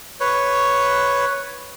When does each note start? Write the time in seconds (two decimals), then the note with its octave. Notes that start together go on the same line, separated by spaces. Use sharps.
0.20 B4 C#5